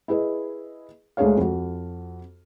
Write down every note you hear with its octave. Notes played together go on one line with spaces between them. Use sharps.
E4 G#4 B4 D#5
D2 G#3 D4 G#4 C#5 F5
F2 F#4